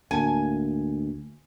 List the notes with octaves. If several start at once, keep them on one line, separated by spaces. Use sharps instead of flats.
D2 A2 A#3 G#5